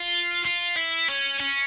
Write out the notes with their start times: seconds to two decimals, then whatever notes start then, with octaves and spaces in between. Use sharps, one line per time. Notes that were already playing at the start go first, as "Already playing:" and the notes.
Already playing: F4
0.46 F4
0.76 E4
1.08 C#4
1.40 C#4